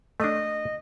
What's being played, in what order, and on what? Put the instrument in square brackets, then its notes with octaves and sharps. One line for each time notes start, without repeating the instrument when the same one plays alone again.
[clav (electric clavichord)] A3 D4 [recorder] D#5